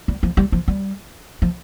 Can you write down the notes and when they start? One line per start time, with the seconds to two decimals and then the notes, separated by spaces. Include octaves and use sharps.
0.08 G3
0.23 F3
0.37 G3
0.52 F3
0.68 G3
1.42 F3